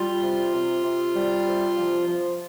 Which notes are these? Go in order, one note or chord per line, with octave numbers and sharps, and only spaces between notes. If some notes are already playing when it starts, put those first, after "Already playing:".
Already playing: G3 F4
C3
C3
C3
G3
C3
F3
F3